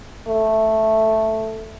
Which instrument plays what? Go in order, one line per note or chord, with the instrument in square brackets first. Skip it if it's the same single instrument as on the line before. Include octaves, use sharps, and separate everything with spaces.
[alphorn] A3